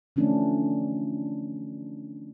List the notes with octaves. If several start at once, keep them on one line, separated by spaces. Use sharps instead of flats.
D3 E3 F3 A3 C#4 D4